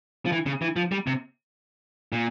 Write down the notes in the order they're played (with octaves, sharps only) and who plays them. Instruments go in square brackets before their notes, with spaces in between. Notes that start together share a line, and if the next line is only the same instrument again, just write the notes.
[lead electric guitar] F3
E3
C#3
E3
F3
G3
C3
A#2